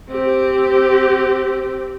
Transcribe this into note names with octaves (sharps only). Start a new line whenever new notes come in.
C4 G4